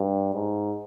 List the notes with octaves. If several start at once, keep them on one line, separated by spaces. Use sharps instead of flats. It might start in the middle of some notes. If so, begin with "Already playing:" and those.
Already playing: G2
G#2